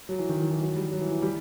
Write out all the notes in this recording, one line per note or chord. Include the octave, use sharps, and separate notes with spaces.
F#3
E3
D#3
E3
E3
F#3
G3
F#3
E3
E3
G3